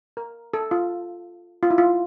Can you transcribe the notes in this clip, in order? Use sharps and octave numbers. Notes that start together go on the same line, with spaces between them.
A#4
A4
F4
F4
E4
F4